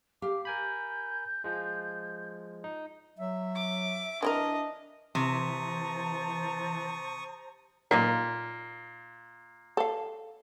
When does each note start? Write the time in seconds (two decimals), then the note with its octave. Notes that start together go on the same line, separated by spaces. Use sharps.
0.22 G4 F5 D6
0.45 A#4 G#5 B5 G6
1.44 F3 G#3
2.64 D#4
3.18 F#3 E5
3.55 D6
4.23 E3 D4 E4 A#4 D#5
5.15 C3 E3 C5 A5 A#5 C#6 D#6
7.91 A#2 A#3 D#4 A#4
9.77 A4 F5